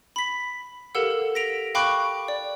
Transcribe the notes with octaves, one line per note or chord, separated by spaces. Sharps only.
B5 B6
G4 A4 A#4 F5 F#5 E6
A#6 B6 D7 F7
F5 G5 B5 C#6 D6 F#6
D5